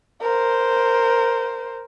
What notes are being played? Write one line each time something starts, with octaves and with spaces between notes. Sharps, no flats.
A#4 C5